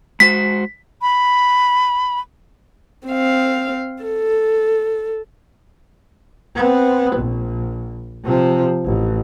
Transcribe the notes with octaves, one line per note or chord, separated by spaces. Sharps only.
G#3 F#4 C5 B6
B5
C4 F5
A4
B3 C4
A#1
C3 F3
A1